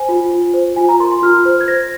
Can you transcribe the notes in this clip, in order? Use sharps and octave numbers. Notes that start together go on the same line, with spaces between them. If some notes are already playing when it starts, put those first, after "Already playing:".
Already playing: C5 G#5
F4
F4
C5
F4 G#5
A#5
A#4 C6
C6
F4 F6
C5
G#6
C5 A#6